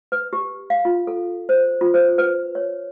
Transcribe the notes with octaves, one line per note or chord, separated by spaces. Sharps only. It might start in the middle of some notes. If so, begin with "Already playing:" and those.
B4
G4
F5
F4
A4
C5
F4
C5
B4
C#5